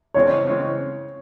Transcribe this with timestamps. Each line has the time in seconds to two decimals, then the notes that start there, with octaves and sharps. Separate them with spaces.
0.14 C#3 E3 G#3 C4 C#5
0.47 C#3 E3 G#3 C4